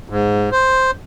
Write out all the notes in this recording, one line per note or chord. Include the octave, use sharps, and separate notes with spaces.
G#2
C5